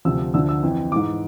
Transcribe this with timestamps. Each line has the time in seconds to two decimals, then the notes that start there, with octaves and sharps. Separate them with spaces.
0.05 D2 C3 F3 E6
0.34 D2 D3 F3 E6
0.49 E6
0.63 F2 E3
0.92 E3 D6
0.96 G#2